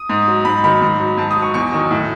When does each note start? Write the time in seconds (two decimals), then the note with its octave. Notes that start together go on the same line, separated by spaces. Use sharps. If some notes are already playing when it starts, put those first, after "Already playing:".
Already playing: D#6
0.09 G#2
0.28 F#3
0.45 G#2 B5
0.64 D#3 F#3 B5
0.81 G#2
1.00 F#3
1.17 G#2 A5
1.31 D#6
1.37 F#3
1.42 C#6
1.54 E2 C#6
1.72 D#3 F#3
1.91 A2